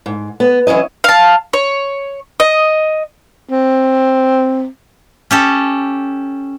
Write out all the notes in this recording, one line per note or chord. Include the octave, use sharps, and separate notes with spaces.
G#2
B3
E3 F#3 C#4 E4 D#5
F5 A5
C#5
D#5
C4
C#4 G4 A4